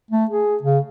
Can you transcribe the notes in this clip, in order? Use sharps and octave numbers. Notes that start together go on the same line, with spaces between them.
A3
G#4
C#3